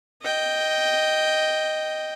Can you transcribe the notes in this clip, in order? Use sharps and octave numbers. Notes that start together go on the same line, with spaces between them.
D#5 G5